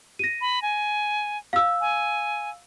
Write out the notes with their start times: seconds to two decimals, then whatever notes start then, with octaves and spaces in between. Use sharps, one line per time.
0.19 A#6 D#7
0.41 B5
0.62 G#5
1.53 F5 E6
1.81 G#5